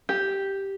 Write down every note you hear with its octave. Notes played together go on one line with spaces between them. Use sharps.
G4